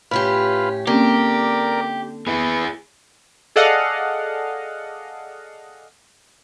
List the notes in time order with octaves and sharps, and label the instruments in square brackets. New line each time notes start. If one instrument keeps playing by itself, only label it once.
[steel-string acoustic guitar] A2 C#4 G4 [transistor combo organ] F4 B4 [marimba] B5
[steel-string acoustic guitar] D3 [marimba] A#3 C4 C#4 [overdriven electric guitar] G4 [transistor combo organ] A#4 D5
[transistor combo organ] B3 [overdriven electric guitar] E4 G#4
[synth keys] G#4 A4 D5 D#5 F5 F#5